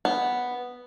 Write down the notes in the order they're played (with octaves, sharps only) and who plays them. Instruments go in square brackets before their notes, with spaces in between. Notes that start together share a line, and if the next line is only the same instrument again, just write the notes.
[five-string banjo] B3